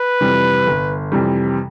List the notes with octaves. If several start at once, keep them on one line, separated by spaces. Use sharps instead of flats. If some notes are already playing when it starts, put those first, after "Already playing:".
Already playing: B4
F2 C3 E3 G3
G1
F2 C3 E3 G3